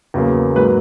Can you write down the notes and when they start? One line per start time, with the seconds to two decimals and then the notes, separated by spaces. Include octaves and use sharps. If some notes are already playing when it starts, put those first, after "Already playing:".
0.14 E2 C#3 F#3 A#3
0.55 G#2 F#3 A#3 B4